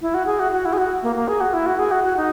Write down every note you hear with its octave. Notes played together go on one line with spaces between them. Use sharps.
E4
F#4
G#4
F#4
F#4
E4
G#4
F#4
A#3
A#3
G#4
F#4
E4
F#4
G#4
F#4
F#4
D#4